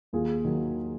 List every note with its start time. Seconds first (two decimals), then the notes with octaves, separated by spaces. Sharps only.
0.13 D#2 F4 G#4
0.44 D#3 F#3